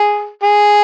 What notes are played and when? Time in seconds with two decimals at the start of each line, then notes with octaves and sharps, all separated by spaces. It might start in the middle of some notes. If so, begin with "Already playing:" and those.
Already playing: G#4
0.44 G#4